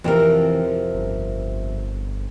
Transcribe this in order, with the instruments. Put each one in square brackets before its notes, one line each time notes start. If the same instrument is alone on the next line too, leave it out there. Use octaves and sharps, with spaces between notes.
[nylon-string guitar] F2 C3 A#4 [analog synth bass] E3
[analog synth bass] G1